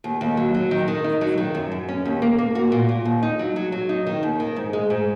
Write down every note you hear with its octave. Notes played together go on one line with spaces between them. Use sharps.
D#2
D#2
F#3
F#3
D#3
D#3
D#4
F#3
D#3
F#2
F#2
C#4
D#2
A#3
A#3
F#4
A#2
A#2
D#2
D#4
F#3
F#3
F#3
D#4
D#3
D#2
D#3
G#2
G#3
G#2